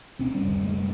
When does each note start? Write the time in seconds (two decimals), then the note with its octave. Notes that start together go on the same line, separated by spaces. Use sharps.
0.19 D2 B2 C4 C#4
0.34 F#2 C3 G3
0.47 D1 D3
0.63 G#3 A3